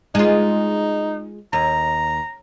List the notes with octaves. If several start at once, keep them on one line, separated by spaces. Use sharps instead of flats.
G#3 D#4 F4
D#2 A#5